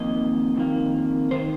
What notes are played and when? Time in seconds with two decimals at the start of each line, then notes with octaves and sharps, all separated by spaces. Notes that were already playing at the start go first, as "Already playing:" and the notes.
Already playing: F2 D#3 A#3 D#5
0.56 F2 D#3 A#3
1.31 D#3 C5